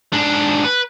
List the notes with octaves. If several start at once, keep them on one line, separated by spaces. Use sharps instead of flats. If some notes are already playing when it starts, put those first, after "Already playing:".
G#2 D4
B4